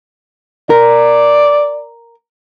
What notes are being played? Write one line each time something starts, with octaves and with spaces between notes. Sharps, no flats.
A#4 D5